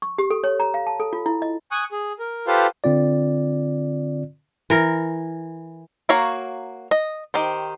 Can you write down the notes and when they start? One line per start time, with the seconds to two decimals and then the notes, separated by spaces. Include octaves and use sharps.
0.02 C#6
0.18 G4
0.30 A4
0.44 C#5
0.60 A#5
0.74 F5
0.87 A5
1.00 A4
1.13 F4
1.26 E4
1.42 D#5
1.71 G#5 C#6 D#6 F#6
1.92 G#4
2.19 A#4
2.47 F4 G4 A4 B4 C5 F5
2.84 D3 C4 F4 D5
4.70 E3 A#4
6.09 A#3 F#4 C#5 F5 A#5
6.91 D#5
7.34 D#3 G4 C5